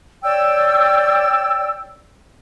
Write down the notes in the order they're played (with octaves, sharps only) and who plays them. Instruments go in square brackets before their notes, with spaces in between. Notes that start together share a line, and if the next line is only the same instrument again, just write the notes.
[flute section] C#5 D5 G5 E6